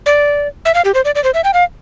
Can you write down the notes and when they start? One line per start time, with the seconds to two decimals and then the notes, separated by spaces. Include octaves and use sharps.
0.06 D5
0.65 E5
0.75 F5
0.85 G4
0.94 C5
1.05 D5
1.15 D5
1.24 C5
1.34 E5
1.44 G5
1.54 F5